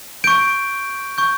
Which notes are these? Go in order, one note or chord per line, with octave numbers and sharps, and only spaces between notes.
C#6 G6 D7
C#6 G6